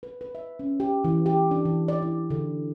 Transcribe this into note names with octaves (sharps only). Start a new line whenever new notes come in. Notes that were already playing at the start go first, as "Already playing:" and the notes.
B4
B4
E5
C#4
G4
E3
G4
D4
E3
D5
E4
D3